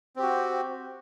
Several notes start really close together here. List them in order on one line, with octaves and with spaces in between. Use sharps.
C4 G4 F#4